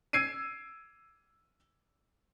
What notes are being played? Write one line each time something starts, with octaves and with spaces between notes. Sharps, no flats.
E6 G#6 C7 D7 D#7